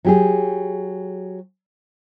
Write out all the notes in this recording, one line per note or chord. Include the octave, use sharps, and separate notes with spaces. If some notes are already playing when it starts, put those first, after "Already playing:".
F#3 G4 G#4